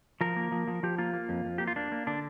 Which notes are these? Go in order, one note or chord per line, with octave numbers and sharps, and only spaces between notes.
F3 A#4
A#3
F3
F3
F3 G4
A#3 F4
A#3
F2
F2
A#3 G4
F4
A#3 D4
A#3
D3 D4